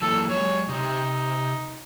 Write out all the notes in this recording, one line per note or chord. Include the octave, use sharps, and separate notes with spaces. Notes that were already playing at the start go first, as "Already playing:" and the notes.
E3 F#3 A#3 A4
F#3 G#3 C#5
C3 D#4 G4